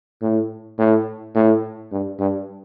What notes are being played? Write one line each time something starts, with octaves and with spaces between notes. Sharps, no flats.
A2
A2
A2
G2
G2